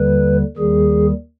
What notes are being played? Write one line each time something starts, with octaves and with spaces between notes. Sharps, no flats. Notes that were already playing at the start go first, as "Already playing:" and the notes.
Already playing: D#2 D3 G3 B4
D#2 D#3 G3 G#4